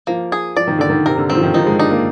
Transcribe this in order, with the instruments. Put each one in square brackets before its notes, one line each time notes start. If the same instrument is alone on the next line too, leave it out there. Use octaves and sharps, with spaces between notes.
[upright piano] F3 [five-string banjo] A#3
[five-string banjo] G#4
[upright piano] F3 [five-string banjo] D5
[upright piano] D#3
[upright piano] D3 [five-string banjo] D5
[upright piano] D#3
[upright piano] C3 [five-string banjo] A#4
[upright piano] D3
[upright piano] D#3 [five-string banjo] C4
[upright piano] F3
D#3
[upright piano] F3 [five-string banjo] D#4
[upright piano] G#3
[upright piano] D4 [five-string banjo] D#4
[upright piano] A#3